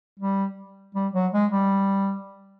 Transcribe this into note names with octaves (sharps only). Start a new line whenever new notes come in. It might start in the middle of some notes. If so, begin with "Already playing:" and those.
G3
G3
F#3
G#3
G3